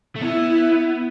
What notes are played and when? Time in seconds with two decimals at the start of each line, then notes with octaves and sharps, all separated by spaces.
0.16 A3
0.22 B3 E4